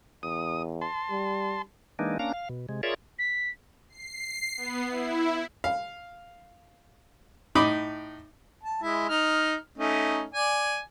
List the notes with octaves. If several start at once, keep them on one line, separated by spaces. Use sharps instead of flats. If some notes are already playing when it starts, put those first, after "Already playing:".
E2 D#6
A5 C6
G3
E3 G#3 A#3 D4 D#4
A#3 C#4 D4 F5 A#5
F5
B2
C3 G#3
F4 G#4 A#4 C#5 D5 E5
B6
C7
B3
E4
F5
A2 D#4 B5 D6 D#6
A5
G#3 E4
D#4 F6
A3 C#4 D#4
D5 G#5